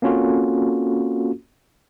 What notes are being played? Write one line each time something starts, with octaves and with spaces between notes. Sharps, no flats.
A#3 C4 C#4 F4 F#4 A4